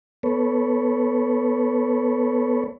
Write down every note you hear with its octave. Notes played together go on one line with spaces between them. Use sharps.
B3 A4 B4 C#5